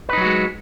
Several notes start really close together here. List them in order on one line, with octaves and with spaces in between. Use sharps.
B4 D#4 F#3 F#4 G#3